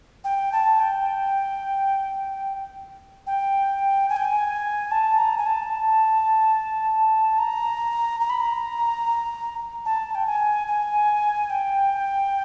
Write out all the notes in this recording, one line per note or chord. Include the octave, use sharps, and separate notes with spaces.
G5
A5
G5
G5
G#5
G5
G#5
A5
A#5
G#5
A5
A#5
A#5
B5
A#5
A5
G5
G#5
G#5
G5